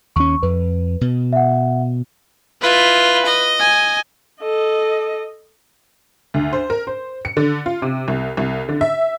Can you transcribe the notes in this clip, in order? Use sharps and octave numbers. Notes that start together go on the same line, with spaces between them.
D#2 C#4 C#6
F2 B4
B2
E5 F#5
E4 F4 B4
D#5
G#5
A4 D#5
D2
C5
A#4
C5
C#7
D3
F4
C3
C2
C2
D3
E5